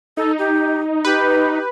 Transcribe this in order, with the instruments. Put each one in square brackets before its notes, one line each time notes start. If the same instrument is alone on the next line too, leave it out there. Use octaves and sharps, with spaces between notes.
[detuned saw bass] D#4 [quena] A4
[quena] G4
[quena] G4 [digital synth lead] B4